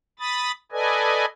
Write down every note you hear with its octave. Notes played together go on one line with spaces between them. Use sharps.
B5 D#6 A6
A4 B4 D5 D#5 G#5